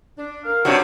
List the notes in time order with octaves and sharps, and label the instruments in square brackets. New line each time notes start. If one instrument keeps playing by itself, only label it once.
[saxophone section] D4
[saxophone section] A#4 [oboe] F5
[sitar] G2 C3 [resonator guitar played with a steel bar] D4 F#4 [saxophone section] C#5